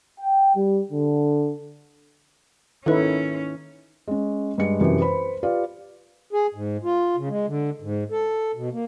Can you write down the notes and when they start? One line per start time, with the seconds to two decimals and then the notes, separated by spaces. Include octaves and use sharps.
0.20 G5
0.55 G3
0.91 D3
2.86 D#3 C#4 D#4 E4 A4 B4
4.07 G#3 C#4
4.58 G2 G#3 C#7
4.81 F#2 C3 E3 G3
5.01 B4 C5 B5
5.43 F4 G4 B4 D5 F5
6.33 G#4
6.54 G#2
6.84 F4
7.16 C#3
7.29 G#3
7.48 D3
7.82 G#2
8.11 A4
8.56 B2
8.72 A#3